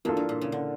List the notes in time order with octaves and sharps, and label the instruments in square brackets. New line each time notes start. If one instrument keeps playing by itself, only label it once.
[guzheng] G2 [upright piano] E3 A#3 D4 F4 A4
[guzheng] G2
A#2
C#3
D3